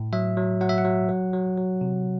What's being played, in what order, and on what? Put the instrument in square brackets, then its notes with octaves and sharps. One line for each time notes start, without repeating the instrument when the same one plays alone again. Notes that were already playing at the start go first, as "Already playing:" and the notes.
Already playing: [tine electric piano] A2
F#3 E5
F#3
F#3 F#5
E5
F#5
F#3
F#3
F#3
F#3
C3